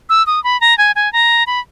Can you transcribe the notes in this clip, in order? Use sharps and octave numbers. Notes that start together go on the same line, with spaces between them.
E6
D#6
B5
A#5
G#5
G#5
A#5
B5